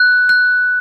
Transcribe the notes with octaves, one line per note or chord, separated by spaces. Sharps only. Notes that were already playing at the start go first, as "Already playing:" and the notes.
Already playing: F#6
F#6